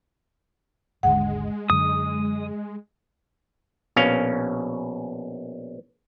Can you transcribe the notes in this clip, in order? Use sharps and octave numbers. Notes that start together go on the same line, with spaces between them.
G#1 D#2 D3 G#3 F#5
F#2 D3 D#6
A#1 B2 C#4 F5